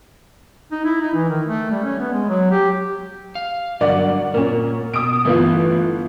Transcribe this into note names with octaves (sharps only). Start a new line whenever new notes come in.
D#4
E4
D#4
E3
D#3
A3
G3
C#4
B3
G#3
F#3
G4
F5
G2 D3 F#3 A#4 D5 F#5
A#2 C#4 A#4
B2 D#6 D7
G1 E3 A3 B3 F4